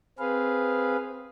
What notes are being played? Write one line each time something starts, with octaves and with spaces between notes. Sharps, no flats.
C4 G#4 B4 F5